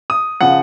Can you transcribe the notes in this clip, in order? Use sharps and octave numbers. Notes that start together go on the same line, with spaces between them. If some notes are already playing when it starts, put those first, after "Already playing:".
D#6
C#3 F3 F#5